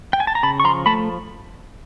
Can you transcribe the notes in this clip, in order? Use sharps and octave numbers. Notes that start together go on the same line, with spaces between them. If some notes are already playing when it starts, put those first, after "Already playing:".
G5
G#5
A5
A#5
C#3 A5 B5
C#6
F3 A#5 C6
A3 A5 B5